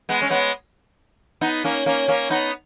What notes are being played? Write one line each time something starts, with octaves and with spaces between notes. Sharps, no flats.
G#3 B3
C#4
G#3 B3
B3 D#4
A#3 C#4
A#3 C#4
A#3 C#4
B3 D#4